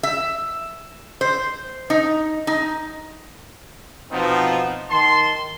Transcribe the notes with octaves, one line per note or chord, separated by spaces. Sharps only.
E5
C5
D#4
D#4
B2 F3 B3 C4 D#4
D#3 A5 C6